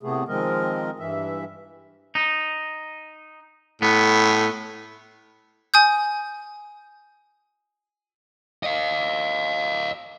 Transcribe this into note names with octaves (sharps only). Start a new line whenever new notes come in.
A2 C3 A3 B3 G#4
D#3 F3 G#3 C4 A#4 D#5
G2 E3 E5
D#4
A2 B3
G#5 D#6 G6
D#5 F5